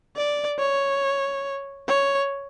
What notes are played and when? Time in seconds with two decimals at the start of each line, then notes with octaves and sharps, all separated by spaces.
0.16 D5
0.59 C#5
1.88 C#5